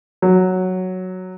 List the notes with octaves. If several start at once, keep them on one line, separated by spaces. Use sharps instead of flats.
F#3